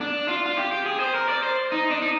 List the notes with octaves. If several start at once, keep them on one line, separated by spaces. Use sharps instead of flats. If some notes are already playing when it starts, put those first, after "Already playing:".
D4
F4
F4
G4
G4
G#4
C5
A#4
D5
C5
D#4
D4
D#4